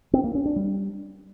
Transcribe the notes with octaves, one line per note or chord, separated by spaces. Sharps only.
C4
A#3
C#4
D4
G3